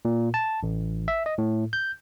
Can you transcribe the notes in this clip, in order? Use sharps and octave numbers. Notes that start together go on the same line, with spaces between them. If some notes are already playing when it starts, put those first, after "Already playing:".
A#2
A5
A1
E5
D#5
A2
G6